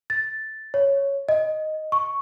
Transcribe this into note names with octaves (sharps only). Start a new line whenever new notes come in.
A6
C#5
D#5
C#6